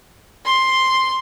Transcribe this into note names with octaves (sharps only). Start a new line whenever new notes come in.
C6